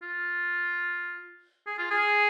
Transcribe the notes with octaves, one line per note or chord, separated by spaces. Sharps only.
F4
G#4
F4
G#4